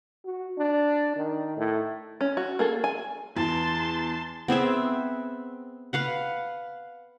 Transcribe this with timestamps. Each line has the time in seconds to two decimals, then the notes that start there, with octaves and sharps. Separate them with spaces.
0.25 F#4
0.58 D4
1.16 D#3
1.57 A2
2.21 C#4
2.37 F#4
2.59 A#3 G#4 A4
2.84 G#5
3.37 E2 A5 C6
4.48 B3 C4 G#4 E5
5.93 B4 F5 F#5